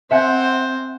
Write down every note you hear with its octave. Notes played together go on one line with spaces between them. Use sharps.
C4 C5 E5 F#5 G#5